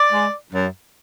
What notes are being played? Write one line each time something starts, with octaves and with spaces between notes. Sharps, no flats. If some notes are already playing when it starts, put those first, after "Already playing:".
Already playing: D5
G#3
F#2